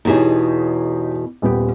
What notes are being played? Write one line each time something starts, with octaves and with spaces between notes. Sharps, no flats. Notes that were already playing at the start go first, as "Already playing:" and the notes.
E2 B2 D#4 G4 G#4 C#5
D#1 B3 G4